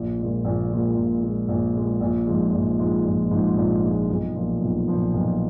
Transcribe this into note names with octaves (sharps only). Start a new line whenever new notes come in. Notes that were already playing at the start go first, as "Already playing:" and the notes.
Already playing: A#1
A#2 G#3
A#1
A#2 G#3
A#1
A#2 G#3
A#1
A#2 G#3
A#1
G#2 F3 G#3
A#1
G#2 F3 G#3
A#1
G#2 F3 G#3
A#1
G#2 F3 G#3
B1
A#2 F3
B1
A#2 F3
B1